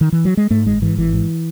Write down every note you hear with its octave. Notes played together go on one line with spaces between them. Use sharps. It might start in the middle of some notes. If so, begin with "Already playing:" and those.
D#3
E3
F#3
G#3
G#2 A3
G#1 G#3
G#2 E3
G#1 E3
G#2